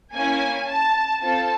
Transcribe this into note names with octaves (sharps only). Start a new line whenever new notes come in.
A#3 C#4 E4 G#5
A5
C4 F4 A4 A5